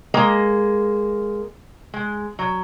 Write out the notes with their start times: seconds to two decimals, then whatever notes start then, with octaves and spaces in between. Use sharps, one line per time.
0.14 G#3 A#3
1.94 G#3
2.39 F#3